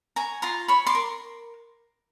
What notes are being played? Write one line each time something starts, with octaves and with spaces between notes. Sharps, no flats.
C#5 G#5 A#5
F4 A#5 C6
C#5 B5 C#6
C6 D6
A#4